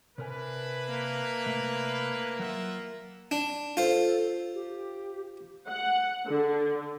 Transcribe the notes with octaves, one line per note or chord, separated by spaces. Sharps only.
C3 D4 E4 A#4 B4 G#5
A#3
C3 A3 E5
F#3 F4 A#4 E5 F#5
D4
F4 A4 C5
G4
F#5
D3